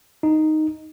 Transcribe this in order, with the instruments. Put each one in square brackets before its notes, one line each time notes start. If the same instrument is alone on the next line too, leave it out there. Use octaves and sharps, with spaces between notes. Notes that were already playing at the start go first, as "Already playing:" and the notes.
[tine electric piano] D#4